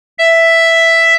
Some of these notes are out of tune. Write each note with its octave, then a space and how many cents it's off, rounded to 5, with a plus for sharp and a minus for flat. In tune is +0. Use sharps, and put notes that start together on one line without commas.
E5 +5